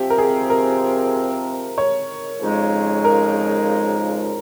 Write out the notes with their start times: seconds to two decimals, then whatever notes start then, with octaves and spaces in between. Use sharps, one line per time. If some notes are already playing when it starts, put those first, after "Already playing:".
Already playing: C3 F3 C4 G4
0.10 A#4
0.18 G#4
0.50 A#4
1.78 C#5
2.40 F2 C#3 F3 G#3 D#4
3.05 A#4